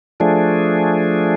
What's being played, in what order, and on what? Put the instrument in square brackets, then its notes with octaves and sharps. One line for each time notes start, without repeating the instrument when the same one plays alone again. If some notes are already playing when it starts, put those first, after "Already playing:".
[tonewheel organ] F3 A3 D4 G#4